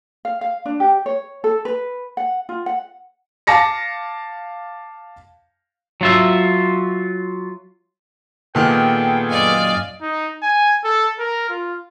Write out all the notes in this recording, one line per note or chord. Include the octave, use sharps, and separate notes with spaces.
F5
F5
D4
G4
C#5
A4
B4
F#5
F4
F#5
F5 A5 D6 A#6 C#7
F#3 F4 E5
A#2 D#3 B3 G#4 A4 G5 F6
F#2 D5 D#5 F5 G#5
D#4
G#5
A4
A#4
F4